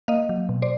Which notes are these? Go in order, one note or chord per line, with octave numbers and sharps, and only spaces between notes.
A#3 D#5 F5
F#3
B2
C5 D5